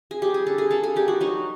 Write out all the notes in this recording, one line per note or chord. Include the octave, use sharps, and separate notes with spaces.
G#4
G3 G4
G#4
D3 A4
G#4
A#3 A4
G#4
G3 G4
F#4
F#3 D#4